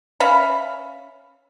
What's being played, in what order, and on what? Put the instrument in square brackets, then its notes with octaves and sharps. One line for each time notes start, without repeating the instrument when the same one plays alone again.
[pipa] C#4 E5 F5 B5